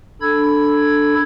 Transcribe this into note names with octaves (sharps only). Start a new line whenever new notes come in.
D4 A4 B5 E6 G#6